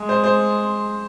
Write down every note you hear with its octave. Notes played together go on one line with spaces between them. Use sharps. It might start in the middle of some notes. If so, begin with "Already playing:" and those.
Already playing: G#3
C5
C5